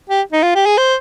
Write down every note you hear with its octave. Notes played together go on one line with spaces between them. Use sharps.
G4
D#4
F4
G4
G#4
C5